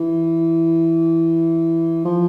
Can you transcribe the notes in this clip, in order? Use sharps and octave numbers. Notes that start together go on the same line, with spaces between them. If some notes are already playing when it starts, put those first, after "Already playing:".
Already playing: E3
F3